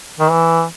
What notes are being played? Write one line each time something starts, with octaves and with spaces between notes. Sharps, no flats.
D#3
E3